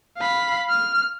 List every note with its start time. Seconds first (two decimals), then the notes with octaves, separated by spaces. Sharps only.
0.18 F5 B5
0.70 F6